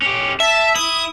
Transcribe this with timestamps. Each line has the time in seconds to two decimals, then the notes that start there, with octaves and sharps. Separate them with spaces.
0.02 C#4 G4
0.40 E5 A5
0.75 E4 D#6